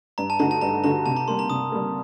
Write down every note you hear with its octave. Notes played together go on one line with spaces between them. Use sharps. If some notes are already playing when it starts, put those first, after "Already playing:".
G2 A#5
A5
D3 A3 D#4 F#4 A#5
A5
G2 A#5
D3 A3 D#4 F#4 A#5
C3 A5
A#5
G3 A#3 C6
A#5
C3 D#6
G3 A#3